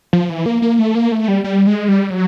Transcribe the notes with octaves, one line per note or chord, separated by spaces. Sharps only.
F3
E3
A#3
A#3
A3
A#3
A3
G3
G3
G#3
G3
F#3